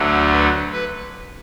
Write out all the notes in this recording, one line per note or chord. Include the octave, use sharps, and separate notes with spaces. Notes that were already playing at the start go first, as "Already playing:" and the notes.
Already playing: D2 D3 F#3 A3
B4
B4